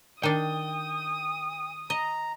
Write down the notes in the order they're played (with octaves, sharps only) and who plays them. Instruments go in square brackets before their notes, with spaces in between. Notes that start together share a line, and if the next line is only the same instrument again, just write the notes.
[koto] D#3 D4 [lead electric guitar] G5 [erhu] D#6
[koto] D#5 [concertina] A#5